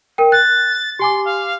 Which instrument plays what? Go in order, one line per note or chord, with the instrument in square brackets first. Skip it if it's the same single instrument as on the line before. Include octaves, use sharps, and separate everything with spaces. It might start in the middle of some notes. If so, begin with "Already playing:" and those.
[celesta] A#4 G5
[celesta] F#6 [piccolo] A6
[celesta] G4 G#5 D6 [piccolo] C6
[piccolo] F5